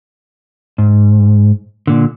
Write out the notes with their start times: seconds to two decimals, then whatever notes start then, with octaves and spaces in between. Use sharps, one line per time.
0.78 G#2
1.87 A#2 D3